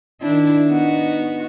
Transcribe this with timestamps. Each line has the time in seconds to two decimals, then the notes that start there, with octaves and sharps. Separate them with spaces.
0.21 D#3 D4 E4
0.68 B3 D#4 F#4